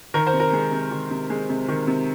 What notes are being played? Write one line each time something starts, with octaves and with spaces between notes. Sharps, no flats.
D#3 A#4
C5
C3
A#4
G#3
C3
D#3
C3
G#3
C3
D#3
C3